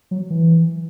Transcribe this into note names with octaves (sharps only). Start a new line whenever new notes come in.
F#3
E3